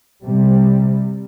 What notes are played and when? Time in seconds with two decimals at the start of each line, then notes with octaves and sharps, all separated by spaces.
0.24 C3 G3